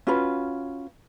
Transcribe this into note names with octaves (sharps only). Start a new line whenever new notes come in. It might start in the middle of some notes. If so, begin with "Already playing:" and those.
C#4 F4 F#4 B4